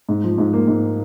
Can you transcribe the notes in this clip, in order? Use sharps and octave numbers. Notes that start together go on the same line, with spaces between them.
G#2
F3
G#2
A#3
G#2